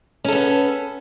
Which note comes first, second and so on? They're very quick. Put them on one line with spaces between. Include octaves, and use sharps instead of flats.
C#4 A4 B3